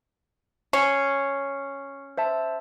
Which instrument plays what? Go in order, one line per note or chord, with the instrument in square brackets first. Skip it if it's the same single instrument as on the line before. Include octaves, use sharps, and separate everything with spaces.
[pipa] C#4 [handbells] C#6 C7 C#7
[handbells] C5 E5 A5